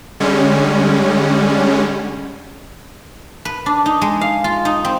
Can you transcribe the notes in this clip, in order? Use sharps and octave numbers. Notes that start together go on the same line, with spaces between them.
D3 G3 G#3 C#4
B4
D4
D#4
G#3
F5
F4
D#4
C4